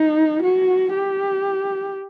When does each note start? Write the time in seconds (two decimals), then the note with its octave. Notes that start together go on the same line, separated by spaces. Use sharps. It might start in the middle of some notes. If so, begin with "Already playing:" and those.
Already playing: D#4
0.43 F#4
0.94 G4